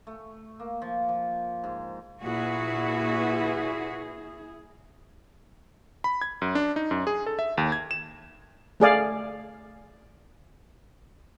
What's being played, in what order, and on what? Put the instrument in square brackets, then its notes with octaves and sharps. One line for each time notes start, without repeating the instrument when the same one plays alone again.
[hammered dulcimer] A3
A#3
F3
F3
G#2
[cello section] A#2 F#4 B4 [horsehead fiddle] E4 G#4
[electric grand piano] B5
G#6
F#2
D4
D#4
F#2
G#4
A4
E5
D#2
G#6
E7
[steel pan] A3 G#4 D5 F5